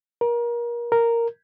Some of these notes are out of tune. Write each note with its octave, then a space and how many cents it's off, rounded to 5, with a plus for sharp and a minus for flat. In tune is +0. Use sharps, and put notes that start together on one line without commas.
A#4 +30
A#4 -5